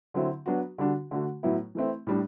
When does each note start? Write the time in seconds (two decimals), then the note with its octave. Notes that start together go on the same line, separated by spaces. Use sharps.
0.14 D3 F#3 C4 E4
0.46 F#3 B3 D4 F#4
0.78 D3 G3 D4 F#4
1.11 D3 A3 D4 F#4
1.43 A2 F#3 B3 E4
1.75 E3 A3 C4 E4
2.07 A2 G3 D4